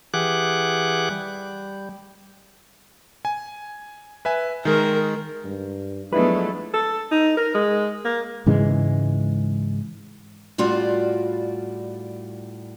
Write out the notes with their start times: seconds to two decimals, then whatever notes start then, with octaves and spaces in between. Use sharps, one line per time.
0.14 E3 G4 G#4 F#5 D6 F#6
1.11 G3
3.25 G#5
4.25 B4 E5 G#5
4.65 D#3 G#3 A#4
5.44 G2
6.13 F3 F#3 G#3 A3 B3 D4 E4 B4
6.74 A4
7.11 D#4
7.37 A#4
7.54 G#3
8.05 A#3
8.46 G#2 C#3 E3 G#3
10.58 A2 G3 F4 F#4 D5